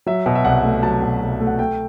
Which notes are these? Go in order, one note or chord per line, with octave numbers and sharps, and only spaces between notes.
F#3 E5
B2
E5
C2 F#5
A3
F#3 A5
B2
C2
A3
F#5
A3 G5